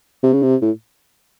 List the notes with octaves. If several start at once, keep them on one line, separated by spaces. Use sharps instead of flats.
C3
C#3
C3
A2